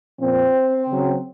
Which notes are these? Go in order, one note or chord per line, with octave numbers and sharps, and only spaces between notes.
A#2 F3 C4
C#3 F#3